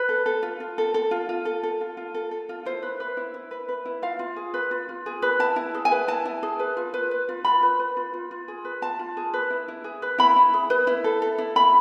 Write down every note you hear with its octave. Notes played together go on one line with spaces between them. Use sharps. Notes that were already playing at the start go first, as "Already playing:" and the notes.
Already playing: B4
A4
A4
F4
F4
A4
A4
F4
F4
A4
A4
F4
F4
A4
A4
F4
E4 C5
B4
B4
E4
E4
B4
B4
E4
F4 F5
F4
G#4
B4
F4
F4
G#4
B4
E4 A5
E4
G#4
G#5
B4
E4 A5
E4
G#4
B4
F4
B4
B4
F4
F4 B5
B4
B4
F4
F4
F4
G#4
B4
F4 A5
F4
G#4
B4
E4
E4
G#4
B4
E4 B5
E4
G#4
B4
E4
A4
A4
E4
E4 B5